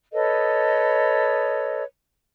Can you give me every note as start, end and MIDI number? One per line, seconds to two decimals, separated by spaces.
0.14 1.83 69
0.14 1.83 71
0.14 1.83 73
0.14 1.83 75